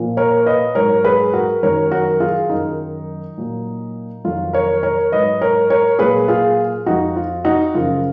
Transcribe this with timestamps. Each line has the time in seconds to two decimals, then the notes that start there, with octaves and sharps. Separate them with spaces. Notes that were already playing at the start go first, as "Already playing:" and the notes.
Already playing: A#2 F3
0.17 A#4 C#5
0.46 B4 D#5
0.75 G#2 F#3 A#4 C#5
1.04 G#4 B4
1.33 F#4 A#4
1.62 F#2 D#3 F#3 A#4 C#5
1.91 F#4 A#4
2.20 F4 G#4
2.50 F#2 D#3 F#3 D#4
3.37 A#2 F#3
4.24 F2 D#3 F#3 F4
4.53 A#4 C#5
4.83 A#4 C#5
5.12 G#2 F#3 B4 D#5
5.41 A#4 C#5
5.70 A#4 C#5
5.99 A#2 F#3 G#4 B4
6.28 F4 G#4
6.86 F2 F3 D#4 F#4
7.16 F4
7.45 D#4 F#4
7.75 F#2 C#3 F3 F4